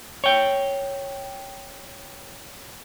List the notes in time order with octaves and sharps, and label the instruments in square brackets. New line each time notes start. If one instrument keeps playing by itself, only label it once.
[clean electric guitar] C#5 G5